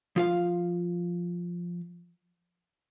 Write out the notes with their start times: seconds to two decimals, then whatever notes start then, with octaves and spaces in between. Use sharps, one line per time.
0.16 F3 F4 F5